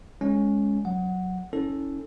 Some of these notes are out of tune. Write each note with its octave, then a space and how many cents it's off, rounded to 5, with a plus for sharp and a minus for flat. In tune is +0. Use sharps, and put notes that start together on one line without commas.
G#3 +0 C#4 +0
F#3 +0 F#5 +0
C#4 +0 E4 -35 A4 +0